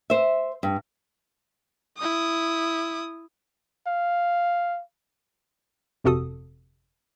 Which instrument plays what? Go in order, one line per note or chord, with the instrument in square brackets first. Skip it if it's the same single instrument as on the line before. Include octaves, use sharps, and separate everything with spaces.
[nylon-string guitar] C5 E5
G2
[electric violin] E4 D#6
[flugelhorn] F5
[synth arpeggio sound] G1 F2 C3 F#4 A4 D#6